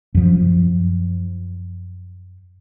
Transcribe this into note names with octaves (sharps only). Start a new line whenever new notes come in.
F#2 F3